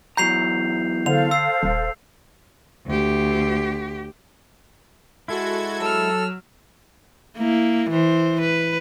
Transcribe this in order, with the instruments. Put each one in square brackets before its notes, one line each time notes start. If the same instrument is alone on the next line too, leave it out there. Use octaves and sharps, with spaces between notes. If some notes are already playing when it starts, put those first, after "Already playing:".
[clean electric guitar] E2 F#3 A#5 [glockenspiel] G6 C7 F7
[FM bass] D3 [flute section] A4 C5 F5 [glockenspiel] F7
[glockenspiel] E6 C7
[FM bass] D#1
[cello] D2 G4
[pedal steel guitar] G#3 E4 [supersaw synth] F#4 A4 G#6
[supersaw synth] F#3 [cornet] A4 [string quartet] E6 F6
[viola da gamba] A#3 E4
E3 C5
B4